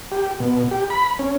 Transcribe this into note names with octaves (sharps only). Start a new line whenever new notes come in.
G4
B2
G4
B5
C#4